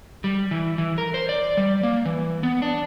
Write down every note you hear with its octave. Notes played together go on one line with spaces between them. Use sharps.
G3
E3
E3
A#4
C5
D5
G3
A#3
E3
B3
D4